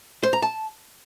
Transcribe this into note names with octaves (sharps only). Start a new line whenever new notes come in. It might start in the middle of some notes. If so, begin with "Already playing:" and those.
C5
A#5
A5